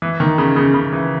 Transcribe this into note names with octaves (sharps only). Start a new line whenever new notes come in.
E3
D#3
C#3
C#3
C#3
E3